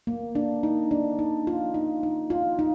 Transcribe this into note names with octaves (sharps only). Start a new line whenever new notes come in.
A#3
D4
D#4
D4
D#4
F4
D#4
D#4
F4
D#4